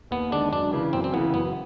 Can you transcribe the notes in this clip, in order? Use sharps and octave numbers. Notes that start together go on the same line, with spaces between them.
D#2 B3
D#3 G#3 D4
F#2 D4
C#3 E3
F#2 C4
C4
C#3 E3 B3
F#2 B3